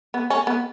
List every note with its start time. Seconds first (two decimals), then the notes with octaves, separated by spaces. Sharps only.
0.14 B3
0.30 C#4
0.47 B3